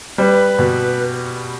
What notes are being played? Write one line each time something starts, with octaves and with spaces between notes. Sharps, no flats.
G3 B4 C5
B2